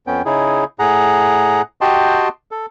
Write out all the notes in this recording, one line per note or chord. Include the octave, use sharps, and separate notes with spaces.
F2 B3 C#4 G5
C#3 D#4 E4 G#4
A2 G#4 F#5 A#5
F#4 G4 D#5 G5 A5 C6
A4